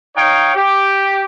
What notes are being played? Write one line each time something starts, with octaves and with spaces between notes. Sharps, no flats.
D#4 C#5 F5 G5
G4